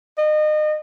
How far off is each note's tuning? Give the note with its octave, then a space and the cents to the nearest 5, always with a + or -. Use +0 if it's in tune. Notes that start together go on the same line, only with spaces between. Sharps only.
D#5 -30